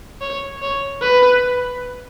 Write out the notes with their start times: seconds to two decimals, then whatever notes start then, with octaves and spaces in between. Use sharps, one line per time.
0.21 C#5
0.62 C#5
1.02 B4